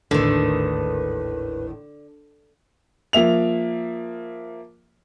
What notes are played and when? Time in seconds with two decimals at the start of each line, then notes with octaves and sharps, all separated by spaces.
0.11 G#1 D#2 A2 D3 D#3 B4
3.13 F3 A#3 E5 F7